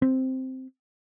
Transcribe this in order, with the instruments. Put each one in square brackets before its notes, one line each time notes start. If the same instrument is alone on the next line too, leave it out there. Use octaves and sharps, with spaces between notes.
[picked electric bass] C4